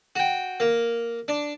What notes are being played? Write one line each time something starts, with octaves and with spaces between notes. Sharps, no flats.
F#4 G5
A#3
D4